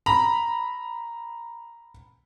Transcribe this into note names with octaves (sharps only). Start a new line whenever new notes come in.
A#5 B5